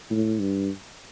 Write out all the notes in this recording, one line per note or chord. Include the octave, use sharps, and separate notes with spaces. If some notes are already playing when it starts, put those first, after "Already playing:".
A2
G2